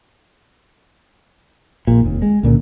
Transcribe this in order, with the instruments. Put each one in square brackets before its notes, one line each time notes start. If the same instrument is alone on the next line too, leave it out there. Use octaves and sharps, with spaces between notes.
[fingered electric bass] A#1 A#2
F1 D#2
G#3
C#2 A#2 D3